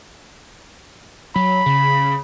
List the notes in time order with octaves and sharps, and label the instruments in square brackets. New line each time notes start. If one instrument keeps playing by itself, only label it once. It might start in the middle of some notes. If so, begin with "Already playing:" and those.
[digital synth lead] F#3 [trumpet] B5
[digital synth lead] C#3